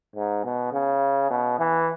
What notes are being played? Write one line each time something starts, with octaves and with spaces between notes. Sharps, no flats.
G#2
B2
C#3
B2
E3